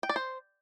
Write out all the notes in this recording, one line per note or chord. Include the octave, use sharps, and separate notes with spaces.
G5
D5
C5